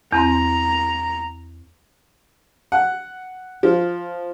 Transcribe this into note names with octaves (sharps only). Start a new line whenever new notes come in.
E2 C4 A#5 C6
F#5
F3